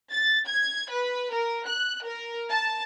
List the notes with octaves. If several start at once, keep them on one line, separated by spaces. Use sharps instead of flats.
A6
G#6
B4
A#4
F#6
A#4
A5